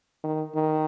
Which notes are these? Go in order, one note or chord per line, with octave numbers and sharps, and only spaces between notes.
D#3
D#3